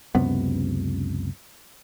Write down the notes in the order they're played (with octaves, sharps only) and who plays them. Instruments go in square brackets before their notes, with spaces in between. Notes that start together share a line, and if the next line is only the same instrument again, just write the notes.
[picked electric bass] C#2 F#2 C3 B3